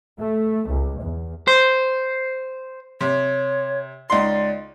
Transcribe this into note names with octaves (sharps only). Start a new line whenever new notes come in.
A3
C#2
E2
C5
C3 C#5
C#2 D#4 D5 C6